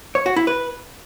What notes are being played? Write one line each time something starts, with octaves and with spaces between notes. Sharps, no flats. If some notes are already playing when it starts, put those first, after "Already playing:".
C#5
F#4
E4
B4